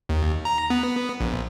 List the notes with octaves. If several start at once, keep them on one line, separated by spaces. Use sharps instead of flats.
D#2
A#5
B3
A#1